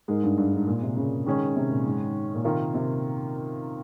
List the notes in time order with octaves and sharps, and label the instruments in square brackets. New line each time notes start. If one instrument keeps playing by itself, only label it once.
[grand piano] G#2 [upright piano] G#3 D#4 A#4
[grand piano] G2
G2
G#2
A#2
C3
C#3
[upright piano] D#3 G#3 C#4
[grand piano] C3
A#2
G#2
A#2
[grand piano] C3 [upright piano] D#3 A#3 F4
[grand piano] C3